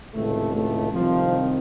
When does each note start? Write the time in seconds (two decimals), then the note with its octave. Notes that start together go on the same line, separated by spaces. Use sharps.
0.13 C#2 A2 C3 D#3 A3
0.53 A2 A3
0.93 C2 C3 D#3 F3